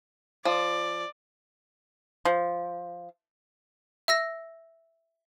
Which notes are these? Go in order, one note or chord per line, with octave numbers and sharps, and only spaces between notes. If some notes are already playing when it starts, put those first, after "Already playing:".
F3 D5
F3
E5 E6 A#6